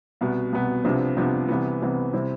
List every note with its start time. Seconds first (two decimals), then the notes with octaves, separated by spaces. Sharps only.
0.21 C2 B2 B3
0.53 C2 B2 B3
0.84 C2 C3 F3 B3 D4
1.16 C2 C3 F3 B3 D4
1.48 C2 C3 E3 B3
1.82 C2 C3 E3 B3
2.13 C3 G3 C4 E4